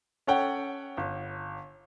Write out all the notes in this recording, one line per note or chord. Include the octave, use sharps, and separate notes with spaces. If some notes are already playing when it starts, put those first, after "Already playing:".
C#4 A4 C#5 F#5 G5
G1